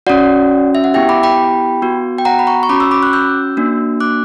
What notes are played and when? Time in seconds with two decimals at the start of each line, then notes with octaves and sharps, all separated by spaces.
0.07 C#4 F#4 D5 F#5
0.75 E5
0.84 F#5
0.94 B3 E4 G4 E5 G5
1.09 B5 D6
1.23 G5 B5
1.82 B3 F#4
2.18 G5
2.25 F#5 A#5
2.39 B5
2.47 A#5 C#6
2.63 C#6
2.69 C#4 F#4 B5 D6
2.80 C#6 E6
2.91 B5 D6
3.02 D6 F#6
3.13 E6 G6
3.57 A#3 D4 F#4
4.00 D6 F#6